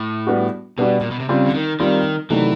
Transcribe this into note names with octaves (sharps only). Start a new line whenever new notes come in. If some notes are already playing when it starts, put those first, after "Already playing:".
Already playing: A2
G3 B3 D4 F#4
B2 G3 B3 D4 F#4
A#2
B2
C3
C#3 G3 C4 F4
D3
D#3
D#3 G3 C4 F4
C3 D#3 E3 F#3 A3 D4